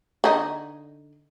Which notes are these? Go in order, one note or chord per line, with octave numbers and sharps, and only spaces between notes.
D3 D#4